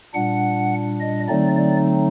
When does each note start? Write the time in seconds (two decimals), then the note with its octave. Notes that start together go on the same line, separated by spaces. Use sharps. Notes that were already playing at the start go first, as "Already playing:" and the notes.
0.14 A#2 G3 D4 F#5
1.00 D#5
1.28 D3 F#3 A3 C4 D#4 D5
1.57 D5